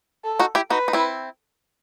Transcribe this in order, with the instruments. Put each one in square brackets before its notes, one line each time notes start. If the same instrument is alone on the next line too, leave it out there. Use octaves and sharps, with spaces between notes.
[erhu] A4
[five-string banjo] D#4 F#4
E4 G4
[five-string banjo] D#4 F#4 [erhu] B4
[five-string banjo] D#4
C4 E4